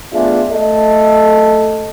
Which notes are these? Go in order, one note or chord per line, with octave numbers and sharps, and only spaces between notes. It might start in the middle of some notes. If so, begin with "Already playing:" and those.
A3 B3 D4 F4 G#4 E5
A3 A4 D#5